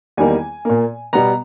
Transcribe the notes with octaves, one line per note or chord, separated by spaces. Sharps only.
E2 D#3 G3 A#3 G#5
A#2 A#3
B2 G3 B3 A#5